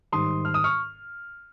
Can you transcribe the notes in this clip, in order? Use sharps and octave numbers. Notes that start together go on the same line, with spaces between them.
G#2 D#3 G3 C6 D#6
F6
D#6
C#6 F6